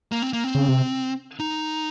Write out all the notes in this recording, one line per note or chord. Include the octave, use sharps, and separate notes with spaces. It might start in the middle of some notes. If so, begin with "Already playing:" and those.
A#3
C4
A#3
C4
C#3
C3
D#4